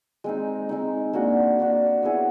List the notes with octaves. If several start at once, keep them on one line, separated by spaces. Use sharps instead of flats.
G#3 C4 D#4
G#3 C4 D#4
A#3 D4 F#4
A#3 D4 F#4
B3 E4 G#4 C#5